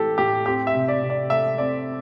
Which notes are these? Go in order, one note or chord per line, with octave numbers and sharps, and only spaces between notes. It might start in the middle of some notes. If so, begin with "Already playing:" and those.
Already playing: A2 E3 A3 C4 G4 A4
A2 G4
C4 G4
E5
C3
D5
C3
D5
A3 E5
C4 D5